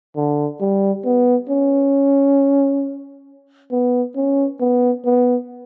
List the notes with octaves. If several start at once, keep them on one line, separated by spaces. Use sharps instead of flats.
D3
G3
B3
C#4
B3
C#4
B3
B3